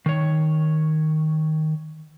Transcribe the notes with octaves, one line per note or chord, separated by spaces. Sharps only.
D#3 C#5